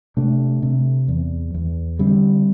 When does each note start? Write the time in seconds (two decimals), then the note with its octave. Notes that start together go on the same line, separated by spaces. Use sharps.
0.17 C3 A3 D4
0.63 C3
1.08 E2
1.54 E2
1.99 D3 G3 C4